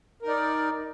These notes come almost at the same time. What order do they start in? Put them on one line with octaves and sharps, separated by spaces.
A#4 D#4 D5